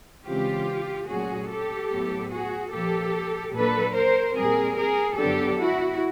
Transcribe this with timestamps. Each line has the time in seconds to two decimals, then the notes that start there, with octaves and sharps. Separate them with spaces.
0.27 C#3 E3 G#3 C4 F4 G4
1.09 A#2 F#3 A3 C#4 F#4 G#4
1.50 G4 A4
1.90 A2 F#3 B3
2.32 F#4 G#4
2.73 A#2 F3 A#3 G4 A4
3.54 A#2 F#3 A#3 D4 A4 B4
3.95 A#4 C5
4.36 A#2 G3 C4 G#4 A#4
4.77 G#4 A#4
5.18 F#2 D3 F#3 B3 D4 G4 A4
5.59 E4 F#4